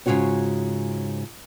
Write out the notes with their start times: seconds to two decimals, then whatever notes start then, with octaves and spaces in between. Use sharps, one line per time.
0.06 G#2 C#3 F#3 F4 F#4 C#5